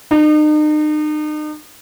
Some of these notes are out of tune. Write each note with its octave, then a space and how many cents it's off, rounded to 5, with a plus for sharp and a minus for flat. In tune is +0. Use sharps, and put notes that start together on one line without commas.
D#4 -40